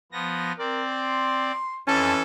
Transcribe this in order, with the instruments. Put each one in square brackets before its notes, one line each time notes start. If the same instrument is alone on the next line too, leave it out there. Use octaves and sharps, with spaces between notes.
[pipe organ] F3 B3 A#6
[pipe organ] C4 D5 [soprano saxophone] A#4
[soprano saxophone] C6
[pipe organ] F2 [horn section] E3 C#4 A4 [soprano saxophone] A5